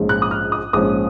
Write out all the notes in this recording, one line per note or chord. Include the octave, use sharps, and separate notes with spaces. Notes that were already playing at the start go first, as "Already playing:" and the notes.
Already playing: A#1 G#2 F3 G#3 C#4
F#6
D#6
F6
D#6
A#1 G#2 F3 G#3 C#4 D#6